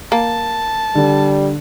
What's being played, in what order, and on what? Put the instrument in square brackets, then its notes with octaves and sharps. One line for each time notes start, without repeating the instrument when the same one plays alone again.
[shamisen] A#3 [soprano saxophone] A5
[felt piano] D3 [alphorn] G3